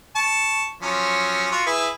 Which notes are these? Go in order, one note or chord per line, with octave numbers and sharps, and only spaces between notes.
A5 C#6
F3 F#3 C#4
F4 F#4
E4 G#4 B4